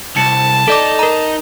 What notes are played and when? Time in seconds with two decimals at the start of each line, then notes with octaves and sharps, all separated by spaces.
0.17 C2 A5 C#7
0.68 D#4 A4 D5 D6
0.99 A#4 A#5